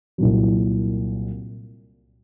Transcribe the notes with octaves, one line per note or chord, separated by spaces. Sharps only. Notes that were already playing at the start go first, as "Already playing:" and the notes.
C2 A#2 F#3